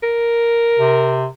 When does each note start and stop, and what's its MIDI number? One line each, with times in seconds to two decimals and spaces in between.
0.03 1.26 70
0.79 1.27 48